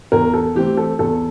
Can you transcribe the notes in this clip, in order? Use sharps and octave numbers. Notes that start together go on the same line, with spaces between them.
E2 A#4
A4
E3 A3 C4 G4
A4
E2 A4